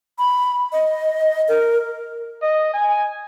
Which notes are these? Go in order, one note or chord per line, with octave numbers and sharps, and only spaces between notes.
B5
D#5
A#4
D#5
G#5